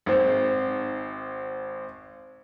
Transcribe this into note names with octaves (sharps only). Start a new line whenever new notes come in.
G#1 C4